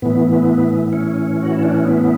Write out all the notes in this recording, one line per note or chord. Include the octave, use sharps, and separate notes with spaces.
A2 E3 B3
B3
C#4
F#4
E4
D4
C#4
B3